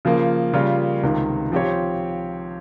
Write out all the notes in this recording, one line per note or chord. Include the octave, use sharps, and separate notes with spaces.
C#3 F3 A#3
C#3 G3 A#3 F4 A#4
C#2 C3 D#3
F3 C4 G4 C#5